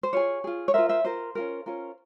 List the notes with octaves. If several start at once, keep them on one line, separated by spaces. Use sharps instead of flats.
C5
F4 G#4 C#5
F4 G#4
C#5
F4 A#4 C5 E5
C5 E5
F4 A#4 C5
C#4 F4 A#4
C#4 F4 A#4